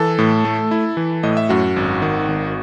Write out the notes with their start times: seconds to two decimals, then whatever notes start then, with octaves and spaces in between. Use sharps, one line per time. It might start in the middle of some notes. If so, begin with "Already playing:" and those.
Already playing: E3 A4 A5
0.18 A2
0.45 A3
0.71 E4
0.97 E3
1.23 A2 D#5
1.37 E5
1.49 F#2 F#4 F#5
1.76 G#1
2.02 D#3
2.28 G#1